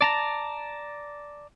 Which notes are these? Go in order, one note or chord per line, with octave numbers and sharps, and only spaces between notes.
D5 A5 A#5